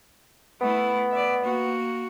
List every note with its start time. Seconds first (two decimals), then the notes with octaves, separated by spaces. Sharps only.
0.61 A3 B3 E4
1.12 D5 E5
1.43 A#3 F#4